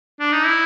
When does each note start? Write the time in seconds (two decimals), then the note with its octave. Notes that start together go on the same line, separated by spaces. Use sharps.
0.20 D4
0.32 D#4
0.46 E4